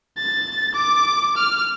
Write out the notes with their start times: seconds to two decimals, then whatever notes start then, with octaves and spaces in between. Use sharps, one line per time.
0.18 A6
0.74 D6
1.36 F6